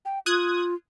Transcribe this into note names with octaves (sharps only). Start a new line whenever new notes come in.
G5
F4 D#6 F#6 G#6